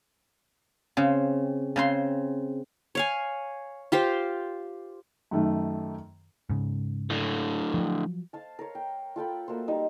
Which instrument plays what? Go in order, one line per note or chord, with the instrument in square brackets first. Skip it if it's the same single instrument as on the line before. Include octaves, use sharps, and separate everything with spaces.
[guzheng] C#3 C4
C#3 C4 C6
[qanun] C#5 F5 G#5
F4 G4 C5
[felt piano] F#2 D#3 A3
[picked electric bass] G#2 C#3
[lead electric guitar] A2 D3
[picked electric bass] F3 F#3
[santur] C5 F5 A5
A#4 C#5
G5
F4 A4 G5 B5
A3 A#3 F#4 C5
G3 D#4 A4